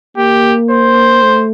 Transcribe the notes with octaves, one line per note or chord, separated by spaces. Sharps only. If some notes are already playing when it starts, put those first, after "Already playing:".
A#3 G4
C5
A3